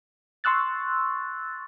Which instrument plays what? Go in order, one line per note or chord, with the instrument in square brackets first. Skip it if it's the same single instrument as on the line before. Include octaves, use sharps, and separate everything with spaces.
[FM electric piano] C6 C#6 E6 F#6 A6